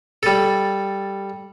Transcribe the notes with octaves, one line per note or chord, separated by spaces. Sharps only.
G3 A4